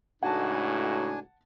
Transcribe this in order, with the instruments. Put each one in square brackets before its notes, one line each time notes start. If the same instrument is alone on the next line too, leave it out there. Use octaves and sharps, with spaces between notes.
[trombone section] C#2 A2 [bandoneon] D4 G#5 [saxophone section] D#4 F#4 [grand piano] F#5 A5